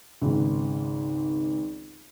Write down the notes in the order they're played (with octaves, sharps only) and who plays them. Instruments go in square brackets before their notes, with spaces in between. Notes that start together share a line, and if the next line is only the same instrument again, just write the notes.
[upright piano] G#1 C#2 G#2